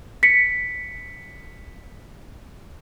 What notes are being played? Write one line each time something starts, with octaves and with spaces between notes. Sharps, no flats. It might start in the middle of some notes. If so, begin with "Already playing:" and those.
B6 C#7